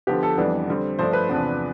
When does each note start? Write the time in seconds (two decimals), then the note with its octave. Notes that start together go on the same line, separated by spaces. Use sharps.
0.07 D3 F3 B3 G4
0.23 A4
0.38 F2 E3 G3 B3 D4
0.68 D3 G3 C4
0.99 G2 F3 A3 D4 C5
1.13 B4
1.29 E2 C3 F3 B3 D4